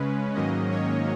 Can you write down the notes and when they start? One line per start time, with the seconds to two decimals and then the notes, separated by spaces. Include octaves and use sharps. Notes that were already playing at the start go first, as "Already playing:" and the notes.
Already playing: C#3 G#3 C#4 B4
0.35 G#2 D#3 F#3 A#3 C#4 D#5
0.71 C#5